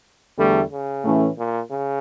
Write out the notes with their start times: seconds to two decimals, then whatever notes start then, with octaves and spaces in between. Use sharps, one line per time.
0.38 E2 D3 G3 A3
0.72 C#3
1.04 A2 E3 A3 C#4
1.38 A#2
1.71 C#3